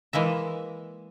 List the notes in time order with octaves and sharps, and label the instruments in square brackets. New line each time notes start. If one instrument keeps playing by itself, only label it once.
[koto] E3 G#3 A#3 E5